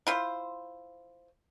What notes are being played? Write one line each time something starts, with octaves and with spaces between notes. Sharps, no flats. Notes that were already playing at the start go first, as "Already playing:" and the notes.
E4 F4 C5